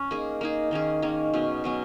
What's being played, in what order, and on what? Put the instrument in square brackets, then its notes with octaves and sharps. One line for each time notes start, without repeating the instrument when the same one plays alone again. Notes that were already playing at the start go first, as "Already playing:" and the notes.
Already playing: [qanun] C#4
A#3 D#4 G#4
A#3 D#4 G#4
D#3 A#3 C#4 G#4
D#3 A#3 C#4 G#4
B2 F#3 C#4
B2 F#3 C#4